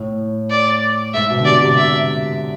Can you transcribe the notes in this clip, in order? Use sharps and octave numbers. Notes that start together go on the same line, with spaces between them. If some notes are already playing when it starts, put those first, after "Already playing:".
Already playing: A2
D5
G#2 E5
B2
D3
C3 D5
C3
E5